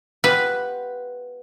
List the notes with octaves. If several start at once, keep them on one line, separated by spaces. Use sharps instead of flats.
B3 F4 G4 B4